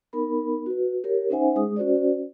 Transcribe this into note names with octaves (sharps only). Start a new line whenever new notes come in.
B3 D#4 A#4 B5
F#4 B4
G4 A#4 C#5
C#4 D#4 C5 E5 F#5 G#5
G#3 G#4 D#6
C#4 F#4 C5 D5